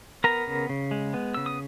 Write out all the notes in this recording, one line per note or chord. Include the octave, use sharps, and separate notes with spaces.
B3 A#4 A#5
C#3
C#3
G#3
B3
C#3 E6
D#6